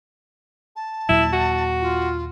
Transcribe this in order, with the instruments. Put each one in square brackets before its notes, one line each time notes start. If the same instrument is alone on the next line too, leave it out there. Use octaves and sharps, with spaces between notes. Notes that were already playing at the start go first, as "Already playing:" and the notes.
[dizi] A5
[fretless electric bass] D#2 A#2 F#3 [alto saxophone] E4
[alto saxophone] F#4
[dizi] F4